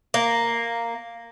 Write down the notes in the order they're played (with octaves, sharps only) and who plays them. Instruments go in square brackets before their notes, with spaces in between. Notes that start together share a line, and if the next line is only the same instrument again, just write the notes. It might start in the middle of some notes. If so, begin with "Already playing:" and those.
[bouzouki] A#3